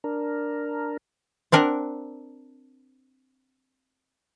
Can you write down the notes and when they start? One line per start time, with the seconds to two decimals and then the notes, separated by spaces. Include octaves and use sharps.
0.04 D4 A#4
1.52 C4 D4 A#4 F#5